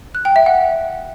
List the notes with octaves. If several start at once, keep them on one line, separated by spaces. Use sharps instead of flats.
F#6
G5
E5
F#5